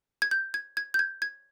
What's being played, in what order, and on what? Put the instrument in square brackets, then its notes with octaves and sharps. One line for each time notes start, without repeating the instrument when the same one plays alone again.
[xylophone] G#6
G6
G#6
G#6
G6
G#6
G#6